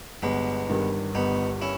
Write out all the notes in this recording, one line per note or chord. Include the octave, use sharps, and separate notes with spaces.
G1 G#3 B3
G2 D#3
G1 B3 D#4
C#4 E4